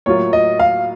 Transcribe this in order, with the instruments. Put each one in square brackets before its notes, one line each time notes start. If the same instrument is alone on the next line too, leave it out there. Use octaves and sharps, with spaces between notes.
[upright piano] A2 F#3 A#3 F4 [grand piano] C#5
[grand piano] D#5
F5